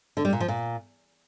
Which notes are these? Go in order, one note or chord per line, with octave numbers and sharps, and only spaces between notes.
D3
G3
A#2
F3
A#2